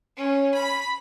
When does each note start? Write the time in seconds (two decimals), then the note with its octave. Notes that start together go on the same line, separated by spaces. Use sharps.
0.17 C#4
0.54 B5